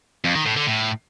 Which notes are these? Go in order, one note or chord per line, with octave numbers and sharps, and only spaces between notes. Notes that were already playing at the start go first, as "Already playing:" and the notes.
F2
D#3
A2
D3
A2